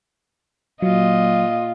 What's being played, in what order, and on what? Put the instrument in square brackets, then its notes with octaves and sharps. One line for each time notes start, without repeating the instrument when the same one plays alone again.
[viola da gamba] A#2 D#5 [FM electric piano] F#3 [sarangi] F4